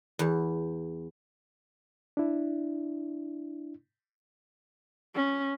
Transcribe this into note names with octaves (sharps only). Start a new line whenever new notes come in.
E2
D4 E4
C#4